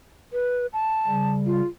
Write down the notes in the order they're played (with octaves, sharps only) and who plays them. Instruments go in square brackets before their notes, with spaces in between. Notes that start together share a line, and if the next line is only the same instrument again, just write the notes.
[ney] B4
A5
[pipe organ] C#3 G3
[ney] F4